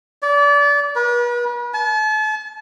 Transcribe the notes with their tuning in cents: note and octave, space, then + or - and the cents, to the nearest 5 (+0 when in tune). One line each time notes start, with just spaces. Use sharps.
D5 -30
B4 -40
A5 -40